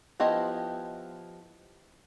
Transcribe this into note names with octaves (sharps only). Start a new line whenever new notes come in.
F3 B3 E4 G4 D#5